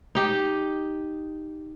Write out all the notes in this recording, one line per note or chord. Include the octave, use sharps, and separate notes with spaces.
D#4 G4